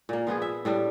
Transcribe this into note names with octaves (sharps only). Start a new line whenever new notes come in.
A#2 A#3
F3 B3 F4 G#4
E5
A2 G3 D4